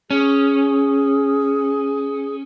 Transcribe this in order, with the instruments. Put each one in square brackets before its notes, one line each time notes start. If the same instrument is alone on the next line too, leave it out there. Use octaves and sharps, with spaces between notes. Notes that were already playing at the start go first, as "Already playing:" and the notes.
[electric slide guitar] C#4 [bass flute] G#4